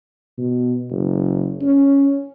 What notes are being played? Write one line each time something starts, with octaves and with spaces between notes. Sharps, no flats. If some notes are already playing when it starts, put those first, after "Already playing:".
B2
F#1
C#4